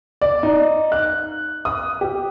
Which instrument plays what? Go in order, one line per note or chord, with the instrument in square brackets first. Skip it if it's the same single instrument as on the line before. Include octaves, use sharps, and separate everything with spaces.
[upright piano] D5
D#4
F#6
D#6
G4